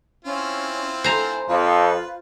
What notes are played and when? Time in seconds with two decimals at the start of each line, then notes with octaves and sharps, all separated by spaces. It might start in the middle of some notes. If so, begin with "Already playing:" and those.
0.25 C4 C#4 E4 F4
1.04 C5 G#5 A#5
1.48 F2 F4 B4